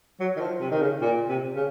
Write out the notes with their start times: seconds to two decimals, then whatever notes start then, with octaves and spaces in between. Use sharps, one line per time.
0.20 F#3
0.36 D#3
0.40 F3
0.61 C3
0.71 D#3
0.81 C#3
1.01 A#2
1.28 C3
1.55 C#3